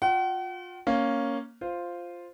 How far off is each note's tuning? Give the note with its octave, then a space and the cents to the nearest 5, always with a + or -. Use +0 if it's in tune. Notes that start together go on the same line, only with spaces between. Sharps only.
F4 +30 F#5 +45
A#3 +0 C#4 +0
F4 +0 C5 +0